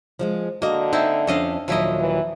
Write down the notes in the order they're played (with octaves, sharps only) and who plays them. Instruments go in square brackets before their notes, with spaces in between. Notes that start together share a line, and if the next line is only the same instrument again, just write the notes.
[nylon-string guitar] F3 F#3 G#3
[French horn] D3 [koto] A#3 [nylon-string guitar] F#4 D#5
[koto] C4 E4 [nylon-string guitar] D#4
[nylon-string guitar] F2 C#4 D4 [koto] A4 D#5 F5
[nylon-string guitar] D#2 A#2 F#3 [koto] F3 E4 D#5
[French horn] E3